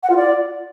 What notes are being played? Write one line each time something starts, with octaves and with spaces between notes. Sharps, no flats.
F#5
F4
D5